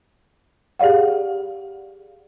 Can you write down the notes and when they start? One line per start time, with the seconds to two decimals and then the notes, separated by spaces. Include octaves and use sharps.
0.80 G4 G#4 D5 F5 F#5